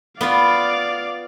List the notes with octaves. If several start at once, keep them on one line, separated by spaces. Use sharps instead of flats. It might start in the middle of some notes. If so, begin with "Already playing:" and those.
B3 F4 D5 F5